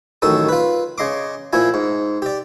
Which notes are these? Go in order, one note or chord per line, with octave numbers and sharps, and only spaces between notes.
A1 F#2 D#3 A4 D#6
F4 B4
C#3 D#5 C6 D6
A#2 F3 E4 G#5
G#2
G4 D5